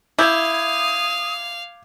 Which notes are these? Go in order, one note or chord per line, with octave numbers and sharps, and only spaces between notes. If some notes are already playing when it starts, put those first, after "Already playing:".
E4 F5 D6 D#6 G6 G#6